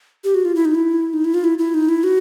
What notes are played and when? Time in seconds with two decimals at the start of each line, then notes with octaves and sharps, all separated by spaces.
0.24 G4
0.35 F#4
0.45 F4
0.55 E4
0.65 D#4
0.75 E4
1.14 D#4
1.25 E4
1.34 F4
1.44 E4
1.58 E4
1.74 D#4
1.89 E4
2.04 F#4